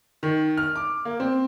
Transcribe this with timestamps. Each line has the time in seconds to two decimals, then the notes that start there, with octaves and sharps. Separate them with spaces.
0.23 D#3
0.57 F6
0.76 D6
1.05 A#3
1.20 C4